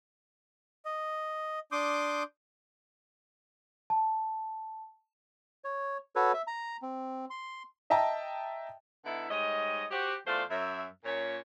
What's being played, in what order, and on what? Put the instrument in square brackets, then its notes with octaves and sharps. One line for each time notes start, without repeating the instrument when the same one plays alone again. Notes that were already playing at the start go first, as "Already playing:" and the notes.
[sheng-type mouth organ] D#5
D4 C6 D6 D#6 G6
[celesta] A5
[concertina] C#5
F#4 A4 B4 C#5
E5
A#5
C4
C6
[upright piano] D#5 E5 G5 A5 A#5
[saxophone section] D3 B3 D#4 E4
G#2 G3 C#5 D#5
F#4 G4 C5
E2 A3 F4 C5 D5 F5
F#2 E5
A#2 C#4 C#5